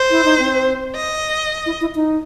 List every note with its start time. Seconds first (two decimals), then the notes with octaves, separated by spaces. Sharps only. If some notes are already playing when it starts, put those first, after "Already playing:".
Already playing: C5
0.11 E4
0.24 D#4
0.39 C4
0.96 D#5
1.66 E4
1.81 E4
1.95 D#4